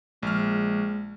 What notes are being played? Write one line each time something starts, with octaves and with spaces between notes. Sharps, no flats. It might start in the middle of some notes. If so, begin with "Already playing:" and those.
A#1 G#3 F6